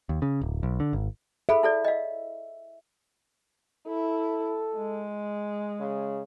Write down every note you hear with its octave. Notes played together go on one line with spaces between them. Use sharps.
D#2
C#3
D1
B1
D3
G#1
G#4 A4 E5 B5
E4 A4 D5
D#5 F5
E4 A4
G#3
C#3